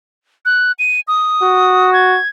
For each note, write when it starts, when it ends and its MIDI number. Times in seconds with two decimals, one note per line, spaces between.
0.45 0.72 90
0.79 1.00 99
1.08 1.93 87
1.43 2.18 66
1.93 2.28 92